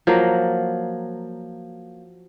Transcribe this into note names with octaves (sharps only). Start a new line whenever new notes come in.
F3 F#3 A#3